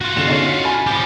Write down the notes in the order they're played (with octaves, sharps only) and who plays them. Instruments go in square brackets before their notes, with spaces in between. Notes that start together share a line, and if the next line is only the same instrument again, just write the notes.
[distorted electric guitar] F4 F#4
[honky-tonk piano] E2 D3 E7
C#4 D#4
F6 B6 C#7
G#5 B5 A6
[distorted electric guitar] F3 G4